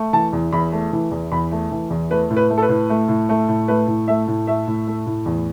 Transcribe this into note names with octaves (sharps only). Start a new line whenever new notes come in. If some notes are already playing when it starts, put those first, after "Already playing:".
Already playing: A3
E3 A5
E2
E2 B5
A3
E3
E2
E2 B5
A3
E3
E2
A3 B4
A2
B4
A3
A4
B4
A2
A3
A2
A3
A2
A3 B4
A2
A3 E5
A2
A3 E5
A2
A3
A2
E2